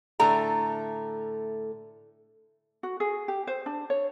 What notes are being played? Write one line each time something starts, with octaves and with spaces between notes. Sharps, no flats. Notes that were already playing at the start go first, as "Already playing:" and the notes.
A2 D3 A3 A#5
F#4
G#4
G4
C5
D4
C#5